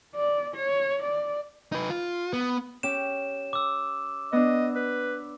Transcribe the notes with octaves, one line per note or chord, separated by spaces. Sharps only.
D5
C#5
D5
D#4 B4
F4
B3
C#4 G4 E7
D6 E6
B3 D4 D#5
B4